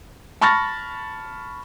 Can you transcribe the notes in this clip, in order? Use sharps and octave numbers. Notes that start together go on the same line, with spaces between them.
A5 B5 C#6 F6 A6 A#6